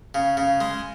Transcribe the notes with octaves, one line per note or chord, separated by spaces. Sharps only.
C#3
C#3
G#3